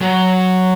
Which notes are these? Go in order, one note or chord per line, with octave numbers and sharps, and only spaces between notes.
F#3